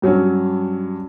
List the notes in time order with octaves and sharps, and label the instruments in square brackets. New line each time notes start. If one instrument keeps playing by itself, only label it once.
[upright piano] G2 F#3 C#4